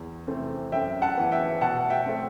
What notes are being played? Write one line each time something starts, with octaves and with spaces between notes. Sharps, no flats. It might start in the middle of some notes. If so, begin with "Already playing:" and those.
Already playing: E2
C3 E3 A3 C4
F#2 E5 G5
F#5 A5
E3 B3
E5 G5
B2 F#5 A5
E5 G5
A3 C4